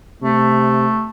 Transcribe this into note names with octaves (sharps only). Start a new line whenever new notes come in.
C3 A3